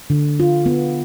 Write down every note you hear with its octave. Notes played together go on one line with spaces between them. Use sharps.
D3
F4
B3